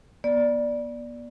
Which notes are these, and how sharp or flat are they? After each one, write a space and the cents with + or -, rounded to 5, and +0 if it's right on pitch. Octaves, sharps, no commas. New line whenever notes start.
B3 -40 D5 +0